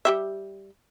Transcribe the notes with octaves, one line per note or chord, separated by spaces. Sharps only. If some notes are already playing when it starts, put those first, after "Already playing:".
G3 G4 E5